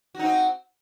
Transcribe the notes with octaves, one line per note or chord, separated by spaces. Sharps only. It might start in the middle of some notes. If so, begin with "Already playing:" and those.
C4 D#4 F#4